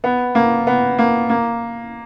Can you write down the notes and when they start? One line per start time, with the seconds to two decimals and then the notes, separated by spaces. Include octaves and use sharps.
0.04 B3
0.35 A#3
0.67 B3
0.98 A#3
1.30 A#3